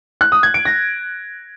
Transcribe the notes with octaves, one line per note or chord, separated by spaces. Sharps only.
F#6
D#6
G#6
D7
A#6